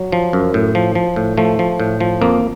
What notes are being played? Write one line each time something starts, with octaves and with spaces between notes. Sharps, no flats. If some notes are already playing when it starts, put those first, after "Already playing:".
Already playing: F#3
F3
F#2
A2
F3
F3
A2
F3 A3
F3
A2
F3
F2 A#3